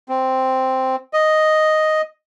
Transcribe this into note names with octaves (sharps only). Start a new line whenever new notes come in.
C4
D#5